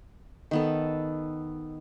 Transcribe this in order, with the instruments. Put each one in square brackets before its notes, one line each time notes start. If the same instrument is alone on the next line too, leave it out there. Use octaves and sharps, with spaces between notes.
[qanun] D#3 B3 A4